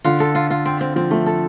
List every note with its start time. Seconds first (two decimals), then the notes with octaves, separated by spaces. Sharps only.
0.04 D3 F4
0.20 A4
0.35 F4
0.50 F4
0.65 C4
0.81 C4
0.96 F3 C4
1.11 F3 A3
1.26 A4